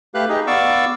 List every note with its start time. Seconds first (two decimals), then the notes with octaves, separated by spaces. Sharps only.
0.14 A3 G4 B4 F5 F#6
0.29 D#4 G4 G#4 D#5
0.47 B3 D5 F5 C#6 D6 E6